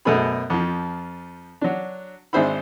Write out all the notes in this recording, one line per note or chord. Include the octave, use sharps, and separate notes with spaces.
F#2 B2 A3 B3 G#4 B5
F2 F3
F#3 D4
G#1 D4 G#4 C5 E5 B5